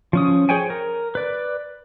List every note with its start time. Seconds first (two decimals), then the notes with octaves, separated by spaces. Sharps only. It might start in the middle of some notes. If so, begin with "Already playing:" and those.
0.13 F3 C#4 D#6
0.49 G#4 C5 C#5 G5 G#5
0.70 A#4
1.15 B4 D5